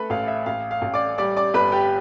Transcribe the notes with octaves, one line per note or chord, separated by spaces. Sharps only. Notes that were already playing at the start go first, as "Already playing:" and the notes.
Already playing: A3 A4 B4 B5
A1 F5
E5
A1 F5
F5
A1
D5 D6
G3 D5 D6
D5 D6
G1 B4 B5
G4 G5